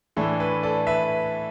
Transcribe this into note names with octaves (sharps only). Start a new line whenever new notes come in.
A2 E3 A3 D4 A4
B4
A4 D5
B4 E5